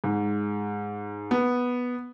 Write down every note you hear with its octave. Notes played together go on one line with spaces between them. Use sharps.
G#2
B3